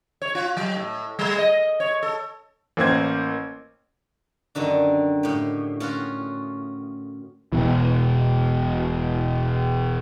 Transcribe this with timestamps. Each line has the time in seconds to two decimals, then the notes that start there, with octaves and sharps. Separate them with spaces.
0.22 C#5
0.35 F4
0.57 F#3
0.76 A2
1.19 G3
1.38 D#5
1.80 C#5
2.03 A4
2.77 A1 A#3 C5 G#6
4.55 F#2 D3 D#3 D4
5.23 A2 G4
5.80 C#4 F4 F#4
7.53 E1 C#2 B2 E3